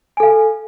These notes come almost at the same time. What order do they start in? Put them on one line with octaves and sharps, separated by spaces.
G#5 A4 F5